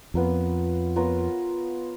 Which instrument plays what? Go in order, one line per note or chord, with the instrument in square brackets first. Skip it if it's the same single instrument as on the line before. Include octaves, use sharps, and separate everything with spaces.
[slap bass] F2 [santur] B3 F4 A#4 C#5
[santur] B3 F4 A#4 C#5